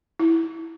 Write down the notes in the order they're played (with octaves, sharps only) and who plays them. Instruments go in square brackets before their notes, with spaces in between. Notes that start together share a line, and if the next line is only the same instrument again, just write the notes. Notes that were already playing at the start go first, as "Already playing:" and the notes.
[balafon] E4